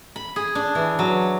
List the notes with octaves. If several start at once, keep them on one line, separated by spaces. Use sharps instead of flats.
B5
G#4
D4
E3
F#3